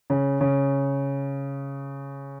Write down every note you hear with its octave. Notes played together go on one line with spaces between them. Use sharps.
C#3
C#3